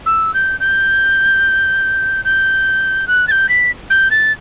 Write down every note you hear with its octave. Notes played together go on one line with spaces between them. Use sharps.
E6
G6
G6
G6
F#6
A6
G6
B6
G6
A6